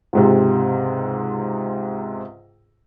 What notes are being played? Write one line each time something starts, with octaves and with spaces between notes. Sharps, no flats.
C#2 G#2 C3